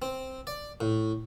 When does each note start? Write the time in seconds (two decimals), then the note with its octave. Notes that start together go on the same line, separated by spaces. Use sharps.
0.02 C4
0.47 D5
0.81 A2